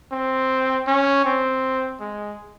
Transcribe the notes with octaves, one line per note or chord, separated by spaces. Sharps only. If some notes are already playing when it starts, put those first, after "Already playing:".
C4
C#4
C4
G#3